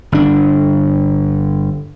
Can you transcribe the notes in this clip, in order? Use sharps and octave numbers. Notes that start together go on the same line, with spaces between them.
G1 D4